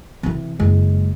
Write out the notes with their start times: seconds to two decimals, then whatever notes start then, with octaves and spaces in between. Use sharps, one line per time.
0.23 C3 E3
0.60 F#1 G#3